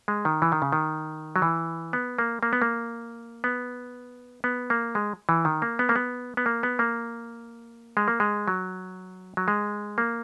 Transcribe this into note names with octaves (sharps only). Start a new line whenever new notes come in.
G#3
D#3
E3
D#3
C#3
D#3
F#3
E3
B3
A#3
A#3
B3
A#3
B3
B3
A#3
G#3
E3
D#3
A#3
B3
A#3
B3
B3
A#3
B3
A#3
G#3
A#3
G#3
F#3
F#3
G#3
A#3